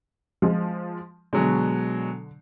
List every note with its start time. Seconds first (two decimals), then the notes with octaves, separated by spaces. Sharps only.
0.42 F3 G#3
1.33 B2 D3 F#3 G#3